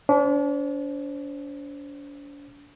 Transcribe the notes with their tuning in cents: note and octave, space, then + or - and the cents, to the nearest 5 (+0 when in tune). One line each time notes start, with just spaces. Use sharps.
D4 -40 C5 +0